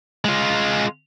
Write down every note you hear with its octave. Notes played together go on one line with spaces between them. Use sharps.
G#3 F4